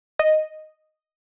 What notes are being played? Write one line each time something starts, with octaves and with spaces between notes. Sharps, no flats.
D#5